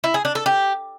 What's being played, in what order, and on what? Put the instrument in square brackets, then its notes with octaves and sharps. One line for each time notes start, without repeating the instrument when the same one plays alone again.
[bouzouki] E4
G#4
D4
A4
G4